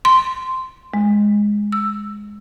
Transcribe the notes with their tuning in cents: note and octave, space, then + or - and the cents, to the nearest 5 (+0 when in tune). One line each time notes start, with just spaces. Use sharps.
C6 -5
G#3 -5
E6 +10